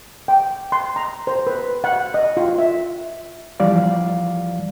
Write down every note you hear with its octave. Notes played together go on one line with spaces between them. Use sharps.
G5
C6
A#5
C5
B4
F#5
D#5
F4
E5
E3 F3 G3 D5 F5